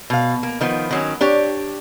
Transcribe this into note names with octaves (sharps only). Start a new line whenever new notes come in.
B2 F5
A#3
D#3 F3 B3
D#3 F#3 C#4
D4 G4 C#5